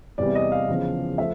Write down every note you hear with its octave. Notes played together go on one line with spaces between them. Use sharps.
E2 C3 E3 G3 D5
D#5
F5
E2 C#3 F3
F3 A3 E5